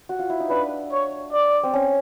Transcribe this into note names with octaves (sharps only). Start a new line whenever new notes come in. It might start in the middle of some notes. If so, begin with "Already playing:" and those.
F#4
F4
E4
D#4
D4 B4
C#5
D5
C4
C#4